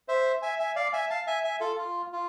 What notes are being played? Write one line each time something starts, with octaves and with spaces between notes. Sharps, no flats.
C5 E5
E5 G#5
E5 G#5
D5 F5
E5 G#5
F5 A5
E5 G#5
E5 G#5
F4 A4
F4
F4